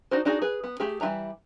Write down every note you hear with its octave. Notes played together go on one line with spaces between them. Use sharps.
D4 D#4 F#4 C5
D4 D#4 F#4 G#4
G#4 B4
B3
A3 G4 G#4
E3 G3 F4 E5 A#5